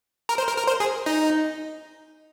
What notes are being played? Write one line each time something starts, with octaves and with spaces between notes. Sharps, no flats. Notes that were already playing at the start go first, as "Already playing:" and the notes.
A#4
C5
A#4
A#4
C5
G#4
D#4